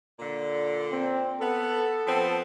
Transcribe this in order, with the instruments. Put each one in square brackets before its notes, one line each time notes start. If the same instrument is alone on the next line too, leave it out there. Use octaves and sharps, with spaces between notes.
[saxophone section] A#2 D3
[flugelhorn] C4
[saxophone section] B3 [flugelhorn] A4
[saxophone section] F3 B3 C4